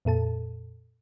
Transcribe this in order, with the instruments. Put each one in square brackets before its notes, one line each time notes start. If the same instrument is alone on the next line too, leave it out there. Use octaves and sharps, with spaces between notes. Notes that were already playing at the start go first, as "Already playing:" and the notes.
[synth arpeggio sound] F2 A#2 A4 A5